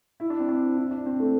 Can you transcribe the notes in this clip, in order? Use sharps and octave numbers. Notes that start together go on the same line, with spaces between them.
E4
D4
C4
D4
E4
D4
C4
A3